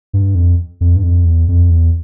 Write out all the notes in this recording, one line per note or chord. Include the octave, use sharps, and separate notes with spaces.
G2
F2
F2
G2
F2
E2
F2
E2